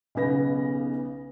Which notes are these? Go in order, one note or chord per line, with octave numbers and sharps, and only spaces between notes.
B1 C#3 B3 A#6